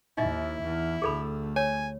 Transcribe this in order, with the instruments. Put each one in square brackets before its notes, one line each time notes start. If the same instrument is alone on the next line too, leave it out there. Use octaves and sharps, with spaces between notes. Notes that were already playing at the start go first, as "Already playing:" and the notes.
[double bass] D#2 [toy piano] D#4 D#5 E5 [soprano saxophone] E4
[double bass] E2
[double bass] D2 A3 [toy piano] G#4 A4 B5
[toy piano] C#5 [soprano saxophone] G#5